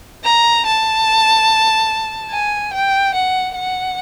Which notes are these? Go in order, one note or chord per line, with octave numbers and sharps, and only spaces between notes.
A#5
A5
G#5
G5
F#5
F#5